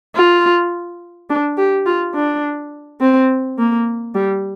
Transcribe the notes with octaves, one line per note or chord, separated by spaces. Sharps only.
F4
D4
G4
F4
D4
C4
A#3
G3